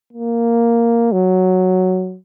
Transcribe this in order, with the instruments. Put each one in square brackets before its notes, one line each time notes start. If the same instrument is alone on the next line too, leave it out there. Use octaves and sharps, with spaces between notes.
[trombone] A#3
F#3